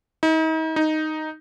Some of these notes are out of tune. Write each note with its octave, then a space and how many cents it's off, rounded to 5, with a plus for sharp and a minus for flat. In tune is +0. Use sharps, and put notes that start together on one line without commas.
D#4 +40
D#4 +0